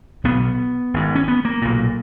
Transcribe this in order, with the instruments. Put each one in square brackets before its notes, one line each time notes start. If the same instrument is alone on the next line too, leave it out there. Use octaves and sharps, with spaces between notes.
[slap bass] B1 B2 B3
G#1 G#2
C#4
B3
A#3
B1 A#2